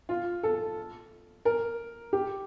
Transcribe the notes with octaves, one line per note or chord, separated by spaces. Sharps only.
F4
A4
A#4
G4